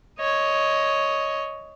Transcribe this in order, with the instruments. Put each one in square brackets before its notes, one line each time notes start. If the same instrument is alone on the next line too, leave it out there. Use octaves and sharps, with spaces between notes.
[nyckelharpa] C#5 D#5